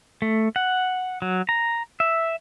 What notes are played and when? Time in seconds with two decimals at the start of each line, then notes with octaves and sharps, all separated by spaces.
0.22 A3
0.56 F#5
1.22 F#3
1.49 A#5
2.00 E5